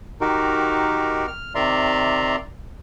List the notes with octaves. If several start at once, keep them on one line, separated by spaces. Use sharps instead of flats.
D#3 D#4 F#4 G4 A#4
F6
C3 D#3 D5 E5 A#5 C6